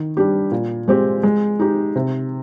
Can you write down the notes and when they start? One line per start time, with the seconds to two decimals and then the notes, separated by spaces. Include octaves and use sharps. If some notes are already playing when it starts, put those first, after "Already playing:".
Already playing: D#3
0.17 G3 D4 G4
0.52 A#2
0.88 G#3 C4 G4
1.23 G#3
1.60 D#4 G4
1.96 C3